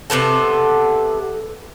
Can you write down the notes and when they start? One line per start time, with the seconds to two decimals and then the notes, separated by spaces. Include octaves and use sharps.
0.10 C3 F3 B3 A4